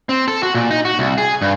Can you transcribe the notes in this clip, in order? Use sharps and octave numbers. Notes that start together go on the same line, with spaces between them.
C4
A4
F#4
A#2
D#4
F#4
C2
G#4
G2